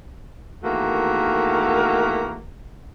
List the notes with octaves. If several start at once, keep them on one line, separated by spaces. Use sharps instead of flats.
E2 D#3 A3 A#3 F#4 A#4